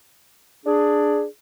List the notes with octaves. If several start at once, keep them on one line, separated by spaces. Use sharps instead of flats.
D4 G#4